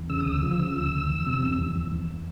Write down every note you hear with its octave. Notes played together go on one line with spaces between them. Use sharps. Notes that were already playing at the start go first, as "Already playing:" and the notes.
Already playing: E2
C#3 E6
D#6
D2
E6
F3
C#3
D2
D2
E2
C3
E2
E2
E2
E2